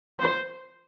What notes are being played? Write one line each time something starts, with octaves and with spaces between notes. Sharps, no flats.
C5